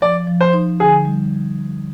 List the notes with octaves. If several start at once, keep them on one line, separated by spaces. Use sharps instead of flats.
F3 D5
F3
C5
D#4
D3 G#4
G3